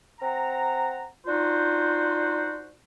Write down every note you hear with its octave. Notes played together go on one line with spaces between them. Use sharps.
C4 F#5 A#5
D4 D#4 F4 F#4 C5